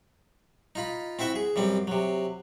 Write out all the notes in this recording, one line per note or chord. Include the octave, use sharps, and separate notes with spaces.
D#4 F4 B5
C4 E4 F#4 E5
G#4
F#2 G3 C4
C3 F#3